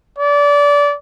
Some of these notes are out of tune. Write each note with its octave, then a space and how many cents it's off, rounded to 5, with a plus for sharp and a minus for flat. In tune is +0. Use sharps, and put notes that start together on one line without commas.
D5 -25